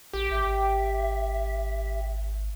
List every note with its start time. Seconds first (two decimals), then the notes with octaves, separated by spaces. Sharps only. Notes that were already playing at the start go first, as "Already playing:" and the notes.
0.13 A1 G4
0.30 G#1 E5